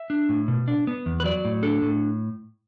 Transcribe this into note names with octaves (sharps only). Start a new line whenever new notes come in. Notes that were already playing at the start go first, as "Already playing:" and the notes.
Already playing: E5
D4
A2
B2
D4
B3
E2
B4
F#3 D5
A2
D4 A4
A2